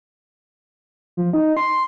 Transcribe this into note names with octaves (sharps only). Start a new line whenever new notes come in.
F3
D#4
C6